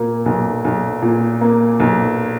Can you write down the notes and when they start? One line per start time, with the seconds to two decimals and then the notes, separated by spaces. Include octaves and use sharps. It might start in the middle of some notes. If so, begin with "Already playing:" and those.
Already playing: A#2 A#3
0.26 B1
0.65 B1
1.02 A#2
1.41 A#3
1.80 B1